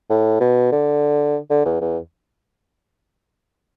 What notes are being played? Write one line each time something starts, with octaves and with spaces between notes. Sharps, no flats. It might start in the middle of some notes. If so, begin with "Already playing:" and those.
A2
B2
D3
D3
E2
E2